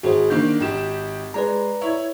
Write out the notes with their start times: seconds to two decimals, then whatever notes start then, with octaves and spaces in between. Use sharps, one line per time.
0.03 G#1 F#4 G#4 C5
0.30 D3 D#3 A#3 G6
0.60 G#1 G4 E7
1.34 G#3 B4 D5 A#5
1.81 E4 C#5